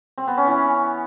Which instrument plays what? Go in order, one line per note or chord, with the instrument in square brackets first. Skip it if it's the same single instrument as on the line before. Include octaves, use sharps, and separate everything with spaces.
[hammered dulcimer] C4
B3
C#4
E3